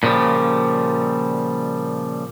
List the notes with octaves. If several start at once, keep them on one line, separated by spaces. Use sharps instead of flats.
A#2 C#3 F3 G3